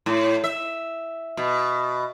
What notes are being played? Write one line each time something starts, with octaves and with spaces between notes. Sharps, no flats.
A2
E5
B2